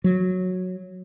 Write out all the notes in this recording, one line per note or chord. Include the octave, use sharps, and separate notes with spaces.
F#3